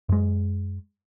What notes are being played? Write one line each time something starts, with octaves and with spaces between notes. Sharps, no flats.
F#2 G#3